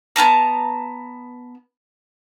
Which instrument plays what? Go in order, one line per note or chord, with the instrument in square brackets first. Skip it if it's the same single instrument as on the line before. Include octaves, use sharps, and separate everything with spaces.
[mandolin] B3 C#4 A5 A#5